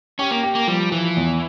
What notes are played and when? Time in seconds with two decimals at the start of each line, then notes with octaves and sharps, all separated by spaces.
0.19 C#4 G4
0.31 A#3
0.43 G4
0.55 A#3
0.68 F3 G3
0.91 E3 F3
1.17 E2